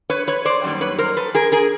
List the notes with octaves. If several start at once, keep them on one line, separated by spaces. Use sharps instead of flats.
B4 C#5
B4 C#5
C5 D5
F#2 D#3 G3 A#3
B4 C#5
A#4 C5
A4 B4
G#4 A#4
G#4 A#4